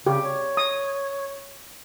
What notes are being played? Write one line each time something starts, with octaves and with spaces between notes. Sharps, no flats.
C#3 G4
C#5
D#6